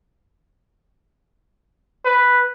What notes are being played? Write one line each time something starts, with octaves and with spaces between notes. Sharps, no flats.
B4